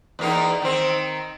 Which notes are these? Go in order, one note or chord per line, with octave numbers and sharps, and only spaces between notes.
E2 A#3 D#4
D#3 C4